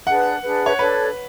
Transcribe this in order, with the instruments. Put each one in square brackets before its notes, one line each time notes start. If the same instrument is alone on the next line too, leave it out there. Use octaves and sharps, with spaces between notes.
[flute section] D4 G#4 B4 [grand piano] F#5
[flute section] D4 G#4 B4
[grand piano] C#5
[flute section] D4 A4 C#5 [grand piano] B4